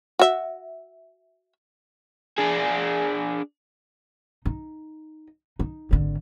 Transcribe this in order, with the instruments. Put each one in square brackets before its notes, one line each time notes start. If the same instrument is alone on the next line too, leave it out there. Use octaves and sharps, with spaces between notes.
[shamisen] F#4 E5
[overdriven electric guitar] D4 G#4
[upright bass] D#4
D#4
G#1 D3